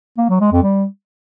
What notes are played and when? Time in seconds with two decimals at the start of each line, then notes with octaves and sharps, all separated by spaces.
0.18 A#3
0.29 F#3
0.41 G#3
0.52 F2
0.63 G3